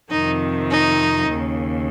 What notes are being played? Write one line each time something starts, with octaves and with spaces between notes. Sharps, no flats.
F2 C3 D#3 D#4
D#4
D#2 C#3